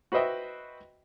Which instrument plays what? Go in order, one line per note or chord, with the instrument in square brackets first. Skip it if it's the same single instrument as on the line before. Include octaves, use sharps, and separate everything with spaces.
[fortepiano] F#4 B4 C5 D#5 E5 G5